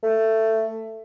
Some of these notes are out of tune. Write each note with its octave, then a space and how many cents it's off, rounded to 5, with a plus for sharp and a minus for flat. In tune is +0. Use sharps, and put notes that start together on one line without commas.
A3 +15